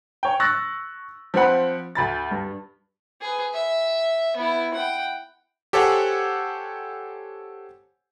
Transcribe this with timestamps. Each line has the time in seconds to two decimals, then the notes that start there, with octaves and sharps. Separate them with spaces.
0.23 C#5 G5
0.40 C#6 E6 F#6 A6 A#6
1.34 F3 C4 C5 F#5 B5
1.95 D2 B5 A6
2.31 G2
3.21 G#4 B4
3.53 E5
4.37 B3 E4
4.74 F#5 G5
5.73 G4 A4 C5 C#5 F#5 G#5